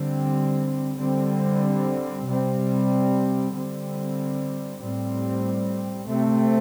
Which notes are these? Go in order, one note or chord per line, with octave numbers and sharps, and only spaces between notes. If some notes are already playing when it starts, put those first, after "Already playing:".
Already playing: D3 G3 C4
D3 G3 C4
C3 G3 C4
D3 G3 C4
A2 G3 C4
C3 A3 C4